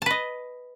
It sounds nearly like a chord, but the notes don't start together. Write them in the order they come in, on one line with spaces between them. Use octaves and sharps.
A5 B4 D#5